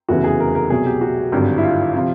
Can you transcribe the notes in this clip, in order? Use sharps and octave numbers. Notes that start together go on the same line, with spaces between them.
F1 E2 C#3 E3 F#4
G#4
A#4
A#4
C2 B2 F#3 G#4
G4
F#4
G#1 G2 D3 F#3
E4
F4
C3 F3